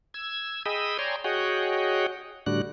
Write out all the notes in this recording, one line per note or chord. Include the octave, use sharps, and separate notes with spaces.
E6 G#6
G#4 D#5 G5 B5 D#6 E6
C#5 D5 G5 G#5 A#5 C6
F#4 G#4 C#5 D#5 F#5 G5
A2 D3 G3 D4 F#4 F#6